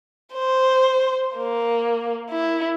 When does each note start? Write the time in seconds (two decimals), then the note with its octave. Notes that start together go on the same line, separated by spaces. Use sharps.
0.34 C5
1.37 A#3
2.31 E4